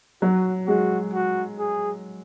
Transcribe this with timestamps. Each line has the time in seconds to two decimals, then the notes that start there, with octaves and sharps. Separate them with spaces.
0.22 F#3 F#4
0.67 G#3 F#4
1.14 F#4
1.59 G#4